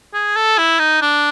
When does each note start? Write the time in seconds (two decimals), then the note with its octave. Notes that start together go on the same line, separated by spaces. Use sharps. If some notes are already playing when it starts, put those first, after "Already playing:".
0.14 G#4
0.36 A4
0.58 E4
0.79 D#4
1.02 D4